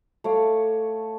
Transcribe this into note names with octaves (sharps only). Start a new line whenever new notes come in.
A3 C#5 F5 D6